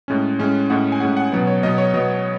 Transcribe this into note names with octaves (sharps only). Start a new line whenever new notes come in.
A2 G#3 C#4
A2 G#3 C#4
A2 G#3 C#4 F#5
G#5
A2 G#3 C#4 F#5
F#5
B2 F#3 B3
C#5
B2 F#3 B3 D#5
C#5
B2 F#3 B3 D#5